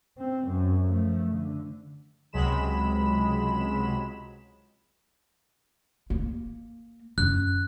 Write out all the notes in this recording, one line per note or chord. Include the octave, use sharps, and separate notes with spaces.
C4
F#2
F3 A3
D3
C#2 C3 F#3 G#3 B5 E7
A#3
F#2 F#6